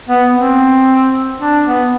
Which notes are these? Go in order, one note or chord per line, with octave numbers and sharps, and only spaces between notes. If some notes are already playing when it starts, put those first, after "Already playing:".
B3
C4
D4
B3